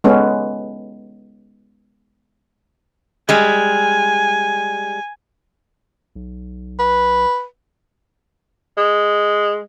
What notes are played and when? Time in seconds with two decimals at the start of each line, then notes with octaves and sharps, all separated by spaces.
0.04 G#3 B3 C#4 A4 B4
3.29 G3 G#3 G#5
6.15 B1
6.80 B4
8.77 G#3